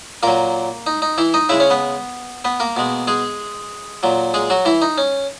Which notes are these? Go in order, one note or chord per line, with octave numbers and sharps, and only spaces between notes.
A#2 F#3 A#3 A#4
D#4
D#4
E3 E4
D#4 D#5
C#3 G#3 E4 E5
C#4 C#5
B3 B4
B3 B4
A#3 A#4
B2 G#3
G#3 G#4
A#2 F#3
G#3 G#4
F#3 F#4
E3 E4
D#4
C#4